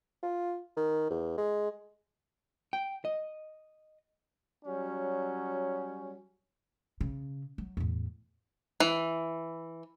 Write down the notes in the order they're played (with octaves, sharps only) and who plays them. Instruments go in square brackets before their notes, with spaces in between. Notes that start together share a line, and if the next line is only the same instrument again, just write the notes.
[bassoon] F4
D#3
E2
G#3
[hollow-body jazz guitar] G5
D#5
[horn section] F#3 G3 C#4
[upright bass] C#3
F#3
E2 A2
[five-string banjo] E3